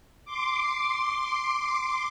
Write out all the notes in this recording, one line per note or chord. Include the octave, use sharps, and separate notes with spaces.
C6 D6